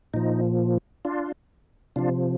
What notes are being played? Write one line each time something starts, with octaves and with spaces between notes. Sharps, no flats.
A#2 F3 D#4
D4 F4
C3 F3 D4 F4